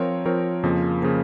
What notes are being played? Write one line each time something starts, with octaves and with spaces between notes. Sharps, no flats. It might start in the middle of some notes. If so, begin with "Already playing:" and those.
Already playing: F3 C4 F4 A#4 C#5
F3 C4 F4 A#4 C#5
F2 C#3 F3 A#3
C#3 F3 A#3